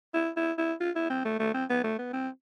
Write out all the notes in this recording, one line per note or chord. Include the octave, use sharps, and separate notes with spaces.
E4
E4
E4
F4
E4
C4
A3
A3
C4
B3
A3
B3
C4